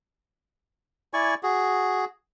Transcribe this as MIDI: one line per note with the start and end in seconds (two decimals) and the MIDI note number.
1.13 1.34 64
1.13 1.34 74
1.13 1.34 80
1.13 1.34 85
1.43 2.05 66
1.43 2.05 68